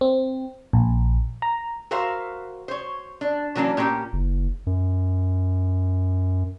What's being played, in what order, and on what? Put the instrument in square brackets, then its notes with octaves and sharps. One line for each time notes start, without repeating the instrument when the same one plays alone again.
[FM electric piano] C4
A#1
A#5
[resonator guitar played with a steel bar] F#4 A#4 C5 E5 F5
C5 C#5
D4
E3 F#3 A#3 C#4 D4
A#2 A#3 C#4 G4
[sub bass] F#1
F#2